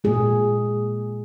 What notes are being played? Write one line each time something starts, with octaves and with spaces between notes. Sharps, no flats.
A#2 G#3 G#4